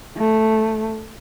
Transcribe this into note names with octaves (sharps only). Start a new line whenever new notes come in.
A3